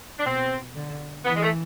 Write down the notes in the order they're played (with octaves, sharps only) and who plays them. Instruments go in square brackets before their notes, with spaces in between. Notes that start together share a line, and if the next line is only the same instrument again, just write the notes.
[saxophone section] D4
[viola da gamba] B2 [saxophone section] C4
[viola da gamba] D3
[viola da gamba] E3 [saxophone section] B3
[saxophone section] G#3
A3